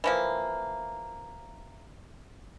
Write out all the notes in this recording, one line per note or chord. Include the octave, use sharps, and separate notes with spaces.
E3 F3 A#3